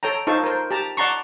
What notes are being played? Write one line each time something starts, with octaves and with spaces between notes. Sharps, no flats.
A4 C#5 G5 A#5
D#4 F4 A4 C5 A5 C#6
A#4 C5
G4 A5 A#5
D5 F#5 A5 A#5 C6 C#6